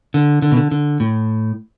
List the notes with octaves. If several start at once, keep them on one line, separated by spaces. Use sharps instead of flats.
D3
D3
B2
D3
D3
A2